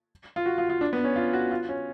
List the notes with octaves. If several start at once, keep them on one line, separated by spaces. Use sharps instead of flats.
F4
F#4
F4
F4
D4
B3
C#4
F4
F#4
F4
C#4